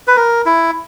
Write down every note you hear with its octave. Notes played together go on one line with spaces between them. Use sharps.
B4
A#4
E4